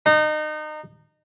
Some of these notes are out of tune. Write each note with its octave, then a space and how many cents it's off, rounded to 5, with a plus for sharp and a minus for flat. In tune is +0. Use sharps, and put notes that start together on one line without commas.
D#4 -25